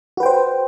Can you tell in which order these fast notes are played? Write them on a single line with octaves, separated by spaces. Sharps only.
F#4 B4 G5 C5